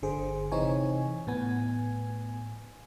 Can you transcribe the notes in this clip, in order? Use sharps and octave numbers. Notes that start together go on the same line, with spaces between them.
G1 D3 G#4 C5
C3 E3 C4 D#4 C#5 G#5
A2 B3 G#5